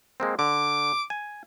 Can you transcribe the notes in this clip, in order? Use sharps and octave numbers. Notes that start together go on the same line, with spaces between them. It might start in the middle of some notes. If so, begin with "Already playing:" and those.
G#3 A#3 C4
D3 D6
G#5